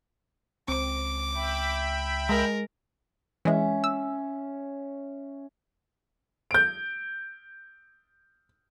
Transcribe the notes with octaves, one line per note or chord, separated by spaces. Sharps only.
C#2 C4 D6
E5 G5 B5
G#3 A#4
E3 G#3 C#4 E5
E6
G6 D7